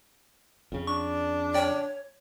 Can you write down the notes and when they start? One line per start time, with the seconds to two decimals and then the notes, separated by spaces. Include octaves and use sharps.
0.72 F2 C#3
0.87 D4 C#6
1.54 C#5 D5 G5